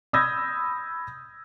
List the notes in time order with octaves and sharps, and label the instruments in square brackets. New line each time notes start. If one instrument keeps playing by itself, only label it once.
[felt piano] B5 D#6 E6 G6 G#6 A#6